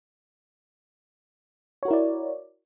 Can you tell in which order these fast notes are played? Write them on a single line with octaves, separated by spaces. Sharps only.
C#5 F#4 A#4 E4 D5